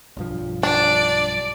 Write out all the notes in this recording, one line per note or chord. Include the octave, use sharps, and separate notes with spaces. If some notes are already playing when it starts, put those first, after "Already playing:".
B1 G2 F3
D4 D5